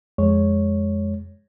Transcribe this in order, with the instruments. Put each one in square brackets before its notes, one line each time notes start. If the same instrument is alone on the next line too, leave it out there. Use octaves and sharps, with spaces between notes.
[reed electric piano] F2 G#3 C#5